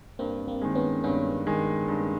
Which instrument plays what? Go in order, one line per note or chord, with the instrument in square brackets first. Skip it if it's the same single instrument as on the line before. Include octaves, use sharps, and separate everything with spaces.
[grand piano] G2 [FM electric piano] A#3 C4
[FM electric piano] A#3 C4
[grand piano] D#3 G#3
[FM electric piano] B3 C#4
[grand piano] G2 [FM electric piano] B3 C#4
[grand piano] D#3 G#3
G2